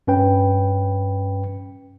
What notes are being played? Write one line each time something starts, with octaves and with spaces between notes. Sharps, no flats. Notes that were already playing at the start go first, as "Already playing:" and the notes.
G2 C#4 B4 G5